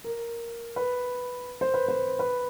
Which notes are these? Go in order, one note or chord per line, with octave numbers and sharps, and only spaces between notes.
A#4
B4
C5
B4
C5
B4